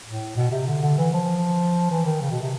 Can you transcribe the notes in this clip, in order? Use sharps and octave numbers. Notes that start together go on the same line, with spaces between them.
A2
B2
C3
D3
D3
E3
F3
E3
D#3
C#3
B2
C3